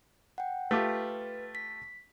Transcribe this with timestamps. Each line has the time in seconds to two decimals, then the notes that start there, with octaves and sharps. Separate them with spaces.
0.38 F#5 G5
0.71 A3 F4 G4 B4
1.55 B6